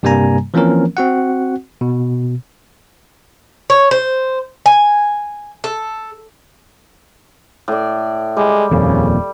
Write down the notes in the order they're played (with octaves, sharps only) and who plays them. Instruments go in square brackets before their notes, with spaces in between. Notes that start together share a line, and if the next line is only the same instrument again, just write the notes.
[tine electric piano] G2 C3 G3 A#3 G#5 A#5
E3 F3 A#3 C4 C#4 A#4
C4 F#4 F#5
B2
[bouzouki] C#5
C5
G#5
A4
[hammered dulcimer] A2 D5
[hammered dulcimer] G3 [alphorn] G#3
[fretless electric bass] D#1 F2 A#2 [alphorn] C#3